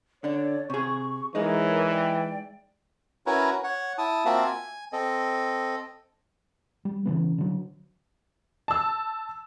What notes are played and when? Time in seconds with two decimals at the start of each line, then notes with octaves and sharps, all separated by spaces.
0.24 D3 D4 C#5 D5
0.70 C3 G#4 C#6
1.35 E3 G#3 D#4 G#4 A#4 C#5
1.90 D5 G5
3.26 C#4 E4 F#4 A#4 B4 C#5
3.64 C#5 F#5
3.98 E4 A5 D#6
4.25 A#3 C4 F4 F#4 E5 A5
4.44 G#5
4.93 C4 A4 D#5
6.85 G3
7.05 C#3 E3 B3
7.38 D3 F#3
8.68 A5 E6